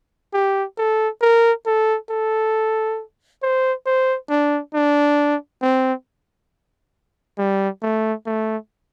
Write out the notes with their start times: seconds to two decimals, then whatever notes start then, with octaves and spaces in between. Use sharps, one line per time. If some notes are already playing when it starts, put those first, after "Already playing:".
0.34 G4
0.78 A4
1.22 A#4
1.66 A4
2.10 A4
3.42 C5
3.86 C5
4.30 D4
4.74 D4
5.62 C4
7.38 G3
7.83 A3
8.26 A3